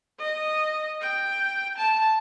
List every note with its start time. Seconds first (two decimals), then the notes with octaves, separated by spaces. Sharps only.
0.19 D#5
1.01 G5
1.77 A5